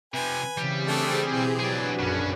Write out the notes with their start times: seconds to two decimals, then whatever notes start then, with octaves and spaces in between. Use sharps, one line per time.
0.14 C3 F3 B4 G#5
0.58 C#3 E3 G3 C4 G4 G#4
0.87 A3 D4
1.29 B2 E3
1.59 F#3 D4 F#4 G#4 B4 D5
1.99 A#1 F#2 C#3 C#4